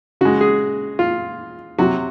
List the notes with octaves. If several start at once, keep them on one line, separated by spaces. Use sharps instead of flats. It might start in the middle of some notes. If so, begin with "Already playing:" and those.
C#3 G#3 F#4
G#4
F4
C3 F#3 F#4